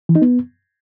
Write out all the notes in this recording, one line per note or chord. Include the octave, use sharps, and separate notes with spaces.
E3
D#4
B3